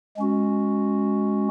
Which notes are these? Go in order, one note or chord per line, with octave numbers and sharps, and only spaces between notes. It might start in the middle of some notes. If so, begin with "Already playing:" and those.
G#3 C#4 F#4